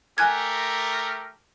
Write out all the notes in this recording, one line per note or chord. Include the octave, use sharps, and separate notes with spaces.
A3 G4 A#4 G#5 F#6 G#6